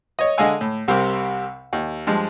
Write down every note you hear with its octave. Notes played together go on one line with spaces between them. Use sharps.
C#5 D#5
D3 G#3 D#5 F5 G#5 E6
A2
C2 C3 C4 G4 A#4
D#2
G2 F3 G#3